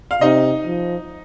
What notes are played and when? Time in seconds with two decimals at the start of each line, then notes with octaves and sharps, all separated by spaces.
0.11 F5
0.21 C3 D#4 D#5
0.66 F3